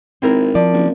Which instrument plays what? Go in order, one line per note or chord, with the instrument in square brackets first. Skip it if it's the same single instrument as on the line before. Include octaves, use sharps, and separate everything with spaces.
[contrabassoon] G#1 [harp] C4 E4 A#4
[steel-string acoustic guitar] F3 D5
[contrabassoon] F#1